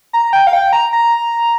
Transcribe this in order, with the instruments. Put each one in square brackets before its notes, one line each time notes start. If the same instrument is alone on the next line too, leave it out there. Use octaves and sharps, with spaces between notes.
[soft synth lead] A#5
G5
F5
G5
A#5
A#5